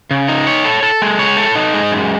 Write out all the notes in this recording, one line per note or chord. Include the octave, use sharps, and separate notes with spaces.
C#3
D#4
C#5
A4
A4
G#3
C#5
A4
D#4
G#3
F#2